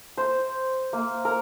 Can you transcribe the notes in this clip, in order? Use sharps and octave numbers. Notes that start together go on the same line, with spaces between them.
C5
A#3
A#4